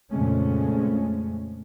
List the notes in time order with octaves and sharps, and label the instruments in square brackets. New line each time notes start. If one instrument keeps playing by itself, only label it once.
[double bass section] F2 A#2 C#3 G#3 A3 C#4